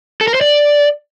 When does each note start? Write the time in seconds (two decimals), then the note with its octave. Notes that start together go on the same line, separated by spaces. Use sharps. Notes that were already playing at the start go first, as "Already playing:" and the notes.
0.21 A4
0.28 A#4
0.34 C5
0.41 D5